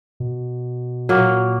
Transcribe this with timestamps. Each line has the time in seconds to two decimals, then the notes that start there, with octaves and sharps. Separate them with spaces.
0.20 B2
1.09 A#2 F#3 A#3